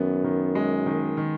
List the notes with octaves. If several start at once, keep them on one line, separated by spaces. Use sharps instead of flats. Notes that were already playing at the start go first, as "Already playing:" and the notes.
Already playing: F#2 D#3 B3
D#3
G#3
D#3
D#3